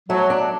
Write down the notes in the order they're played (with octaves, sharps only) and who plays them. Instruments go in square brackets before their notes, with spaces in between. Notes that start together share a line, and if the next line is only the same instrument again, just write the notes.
[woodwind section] F#3 [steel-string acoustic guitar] A3
[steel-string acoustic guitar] D4